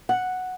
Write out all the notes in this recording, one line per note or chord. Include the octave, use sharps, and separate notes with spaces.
F#5